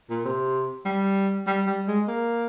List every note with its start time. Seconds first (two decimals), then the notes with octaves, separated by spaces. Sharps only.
0.10 A#2
0.25 C3
0.85 G3
1.47 G3
1.67 G3
1.88 G#3
2.08 A#3